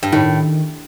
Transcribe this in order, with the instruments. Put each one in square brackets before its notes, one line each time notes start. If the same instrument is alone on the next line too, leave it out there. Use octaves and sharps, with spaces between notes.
[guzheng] G2
[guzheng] A2 [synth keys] D#3